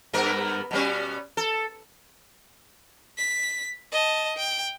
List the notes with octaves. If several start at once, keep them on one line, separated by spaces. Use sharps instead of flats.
G2 B3 A#4
B2 G3 C#4
A4
B6
D#5 A5
G5